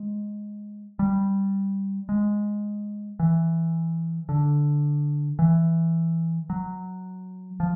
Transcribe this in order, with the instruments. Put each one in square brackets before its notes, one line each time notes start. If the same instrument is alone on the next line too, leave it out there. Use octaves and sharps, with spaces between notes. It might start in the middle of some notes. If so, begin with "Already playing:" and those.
Already playing: [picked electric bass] G#3
G3
G#3
E3
D3
E3
F#3
F3